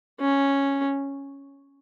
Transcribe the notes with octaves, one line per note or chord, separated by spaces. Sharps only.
C#4